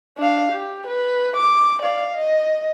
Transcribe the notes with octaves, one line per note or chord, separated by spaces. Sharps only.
D4 F5
G4
B4
D6
D5 F5
D#5